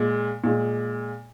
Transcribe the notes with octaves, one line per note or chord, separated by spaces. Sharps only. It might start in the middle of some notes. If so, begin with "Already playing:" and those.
Already playing: A#2 G#3
A#2 G#3